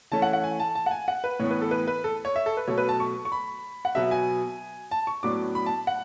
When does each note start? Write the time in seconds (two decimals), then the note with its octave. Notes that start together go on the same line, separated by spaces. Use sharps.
0.12 E3 A3 C#4 A5
0.22 F#5
0.33 F#5
0.44 G#5
0.60 A5
0.75 A5
0.86 F#5
0.91 G#5
1.08 F#5
1.24 B4
1.40 A2 E3 B3 C#5
1.51 B4
1.61 A4
1.71 B4
1.87 B4
2.04 A4
2.25 C#5
2.36 E5
2.46 A4
2.57 B4
2.67 B2 F#3 A3 C#5
2.78 B4
2.89 A5
3.00 C#6
3.25 C#6
3.32 B5
3.85 F#5
3.95 B2 F#3 B3 E5
4.11 G#5
4.91 A5
5.07 C#6
5.23 A2 F#3 B3 D4 D6
5.55 B5
5.66 A5
5.87 F#5